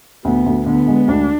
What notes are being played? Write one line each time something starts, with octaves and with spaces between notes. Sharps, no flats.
D2 B3
D2
D3 B3
G#3
D2 D4